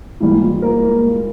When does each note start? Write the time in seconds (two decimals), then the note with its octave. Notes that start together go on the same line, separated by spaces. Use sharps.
0.20 G#2 E3 G3 A#3 E4
0.41 F4
0.62 A#3 A#4
0.83 A#3 A#4